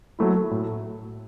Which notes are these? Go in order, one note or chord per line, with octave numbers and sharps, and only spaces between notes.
F#3 A3 E4
A2